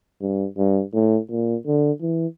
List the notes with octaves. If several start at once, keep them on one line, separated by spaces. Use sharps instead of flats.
G2
G2
A2
A#2
D3
E3